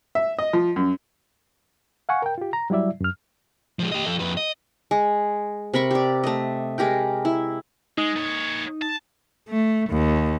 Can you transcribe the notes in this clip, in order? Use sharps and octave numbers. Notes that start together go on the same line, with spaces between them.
E5
D#5
F3
F#2
F5 F#5 G#5 C#6
A#4 G5
F4 G4
A#5
F#3 G3 E4 D5 E5
F#2 F6
F3 G#3
G4 D#5
F3 A4
F2 B4
D#5
G#3
C3 A#4 B5 C#6
G4 D5
A3 D#5
G#3 G4 A#4 G5
E4
G#3 D#4
A#2 C#5
A5
A3
D#2